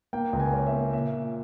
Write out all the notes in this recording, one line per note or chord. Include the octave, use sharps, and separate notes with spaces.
A#3 G5
C#2
G#5
C#4
E5
A#3
A#2 E5
A#2